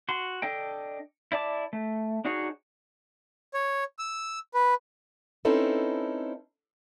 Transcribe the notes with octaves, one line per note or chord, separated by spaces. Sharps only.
F#4 C6
D4 A4 D#5 G5
E4 D5 A5 D6
A3
D4 D#4 F#4 G#4 C#5
C#5
E6
B4
C4 C#4 D#4 E4 A4 B4